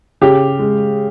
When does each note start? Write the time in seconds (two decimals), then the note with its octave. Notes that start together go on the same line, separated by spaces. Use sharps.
0.21 C#3 G4
0.59 G#3